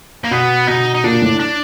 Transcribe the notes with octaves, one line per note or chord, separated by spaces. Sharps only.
A#3
B2 B3
B2 D#4
D#4
A#2 D4
A2
D4